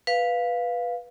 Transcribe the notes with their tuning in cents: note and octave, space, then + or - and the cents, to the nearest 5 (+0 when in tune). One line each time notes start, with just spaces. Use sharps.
B4 -5 F5 +0